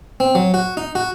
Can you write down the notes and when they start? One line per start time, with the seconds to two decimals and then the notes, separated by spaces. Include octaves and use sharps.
0.20 C4
0.35 F#3
0.54 F#4
0.77 D#4
0.95 F#4